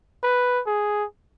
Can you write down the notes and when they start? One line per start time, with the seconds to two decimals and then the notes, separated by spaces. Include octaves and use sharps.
0.23 B4
0.67 G#4